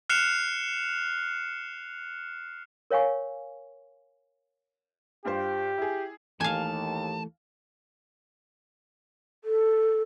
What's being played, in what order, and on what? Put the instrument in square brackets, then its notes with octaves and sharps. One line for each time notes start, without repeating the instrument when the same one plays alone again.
[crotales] F6 F#6 C7 C#7 E7 F7
[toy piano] A#4 C#5 F5 G#5 C#6
[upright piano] G2 F4 C5 [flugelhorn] G4
[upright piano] E4 G#4
[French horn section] D#2 [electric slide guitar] E3 A3 A4 [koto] F5 G#5 [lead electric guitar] A5
[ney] A4